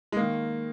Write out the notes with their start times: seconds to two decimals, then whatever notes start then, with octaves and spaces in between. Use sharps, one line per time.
0.12 G#3
0.17 D#3 A#3